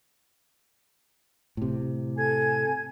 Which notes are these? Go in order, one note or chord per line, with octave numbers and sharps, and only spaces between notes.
A2 C3
A4 G#5 G#6